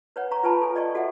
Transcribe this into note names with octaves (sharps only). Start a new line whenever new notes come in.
B4 C#5 F#5
F5 A#5 C#6
F4 B4 G#5 A5 B5
A4 G#5
D5 D#5 G5 C#6
F#4 A4 E5 F#5